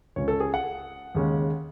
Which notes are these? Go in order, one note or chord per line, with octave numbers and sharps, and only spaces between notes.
C#2 C#3 G#3 C#4 C#5
A4
G#4
F#5
D#2 C#3 G#3 C#4